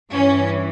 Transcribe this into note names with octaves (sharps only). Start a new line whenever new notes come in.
G2 E3 C#4